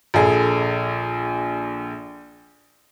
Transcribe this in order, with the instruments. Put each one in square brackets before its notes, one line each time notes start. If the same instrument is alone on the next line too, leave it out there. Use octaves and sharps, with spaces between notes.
[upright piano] A#1 G#4 A4